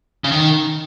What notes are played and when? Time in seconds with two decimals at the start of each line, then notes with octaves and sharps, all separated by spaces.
0.24 C#3
0.32 D#3